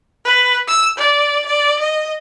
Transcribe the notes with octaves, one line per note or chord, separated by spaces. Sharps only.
B4
E6
D5
D5
D#5